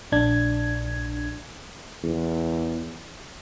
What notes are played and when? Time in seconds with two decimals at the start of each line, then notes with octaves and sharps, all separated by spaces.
0.12 A#1 D4 G#6
2.03 E2